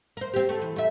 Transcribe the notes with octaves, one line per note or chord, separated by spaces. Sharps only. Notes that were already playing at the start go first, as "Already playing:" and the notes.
A#4 C5
C4 G4
A3
E3
A3 E5